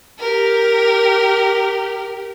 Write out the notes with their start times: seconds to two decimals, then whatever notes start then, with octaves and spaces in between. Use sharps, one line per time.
0.19 G4 A#4